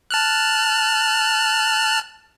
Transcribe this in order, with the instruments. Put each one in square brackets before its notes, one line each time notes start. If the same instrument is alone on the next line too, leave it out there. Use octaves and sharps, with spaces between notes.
[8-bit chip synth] A5 F6 F#6